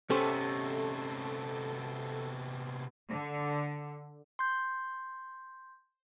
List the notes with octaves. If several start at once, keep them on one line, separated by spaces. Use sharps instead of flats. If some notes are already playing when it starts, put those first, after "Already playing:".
C3 A3 B3 C#4 G4 A4 C5
D3
C6 G6